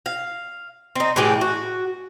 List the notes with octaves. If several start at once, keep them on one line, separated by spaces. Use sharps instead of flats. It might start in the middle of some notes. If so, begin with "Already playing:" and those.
F5
C4 D#4
A2 E3 G4 G#4
F#4